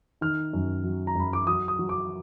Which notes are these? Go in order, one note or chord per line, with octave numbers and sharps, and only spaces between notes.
D#3 F6
F#2
F#3
A#5
F#2 B5
D6
F#3 D#6
D#6
F#3
D6